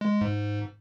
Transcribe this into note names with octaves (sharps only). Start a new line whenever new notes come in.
G#3
G#2